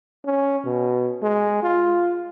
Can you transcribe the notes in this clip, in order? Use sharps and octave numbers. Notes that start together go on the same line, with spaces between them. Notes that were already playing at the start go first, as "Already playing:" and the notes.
C#4
B2
G#3
F4